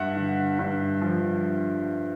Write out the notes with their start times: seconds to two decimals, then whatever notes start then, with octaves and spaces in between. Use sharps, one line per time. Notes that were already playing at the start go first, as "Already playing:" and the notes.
Already playing: G2 E5 F#5
0.16 D3
0.59 G2
1.01 F3